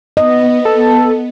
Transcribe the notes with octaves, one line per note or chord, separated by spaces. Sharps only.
B3 D#5
A4